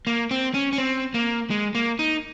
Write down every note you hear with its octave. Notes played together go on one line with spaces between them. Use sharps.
A#3
C4
C#4
C#4
C4
A#3
G#3
A#3
D#4